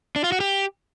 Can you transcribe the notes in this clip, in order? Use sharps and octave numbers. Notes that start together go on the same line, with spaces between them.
D4
F4
F#4
G4